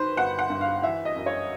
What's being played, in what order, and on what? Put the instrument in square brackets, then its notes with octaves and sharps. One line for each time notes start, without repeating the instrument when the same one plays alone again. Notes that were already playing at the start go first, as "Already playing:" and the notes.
Already playing: [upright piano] D#3 B4 C5
G1 F#5
F#5
G2
F5
E3 E5
D#5
F#2
C#5